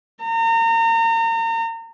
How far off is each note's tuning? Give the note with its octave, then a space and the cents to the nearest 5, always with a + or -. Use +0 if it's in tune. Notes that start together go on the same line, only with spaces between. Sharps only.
A#5 -35